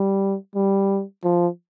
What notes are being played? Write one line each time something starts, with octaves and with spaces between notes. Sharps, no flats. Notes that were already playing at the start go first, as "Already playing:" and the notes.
Already playing: G3
G3
F3